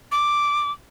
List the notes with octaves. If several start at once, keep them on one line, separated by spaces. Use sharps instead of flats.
D6